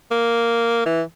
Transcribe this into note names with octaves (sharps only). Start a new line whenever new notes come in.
A#3
E3